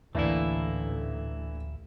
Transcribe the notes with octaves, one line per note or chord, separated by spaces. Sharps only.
A1 D2 D3 E3 A3 A#3 E4 D5